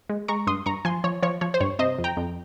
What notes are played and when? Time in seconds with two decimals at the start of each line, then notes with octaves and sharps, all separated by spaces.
0.09 G#3
0.28 G#3 A#5 C#6
0.47 G2 C6 D#6
0.66 G2 A#5 C#6
0.85 F3 G#5 C6
1.04 F3 C#5
1.23 F3 C#5
1.41 F3 C#5
1.54 C5
1.60 G2 C#5
1.79 C3 C5 D#5
1.98 F2
2.04 G5 A#5
2.17 F2